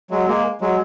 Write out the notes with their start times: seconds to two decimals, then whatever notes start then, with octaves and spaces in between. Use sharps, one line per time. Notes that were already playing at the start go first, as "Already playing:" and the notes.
0.11 F#3 G#3
0.27 G#3 A#3
0.61 F#3 G#3